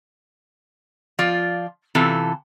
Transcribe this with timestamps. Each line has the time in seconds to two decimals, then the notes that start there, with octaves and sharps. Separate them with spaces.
1.19 F3 F4 D5
1.95 C3 E3 F4 A4